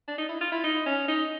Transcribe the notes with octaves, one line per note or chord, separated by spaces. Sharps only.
D4
D#4
E4
F4
E4
D#4
C#4
D#4